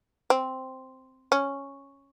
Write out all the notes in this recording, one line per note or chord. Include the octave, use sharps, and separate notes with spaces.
C4
C#4